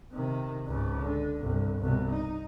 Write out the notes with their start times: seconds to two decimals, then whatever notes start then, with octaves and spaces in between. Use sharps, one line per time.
0.12 C3 D#3
0.67 C#2 G#2
1.02 D3
1.40 G1 C2
1.80 C2 B2
2.12 D#4